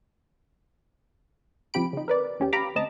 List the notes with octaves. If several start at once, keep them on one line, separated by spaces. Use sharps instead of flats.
C#2 F3 C4 G4 B5 D7
C#3 D#4
A#4 B4 D5
D#2 C#4 G4
G4 F5 A#5 B5 D6
D2 C4 D#5 A5 A#5